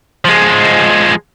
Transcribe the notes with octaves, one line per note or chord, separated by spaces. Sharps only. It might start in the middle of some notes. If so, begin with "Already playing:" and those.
F3 G#3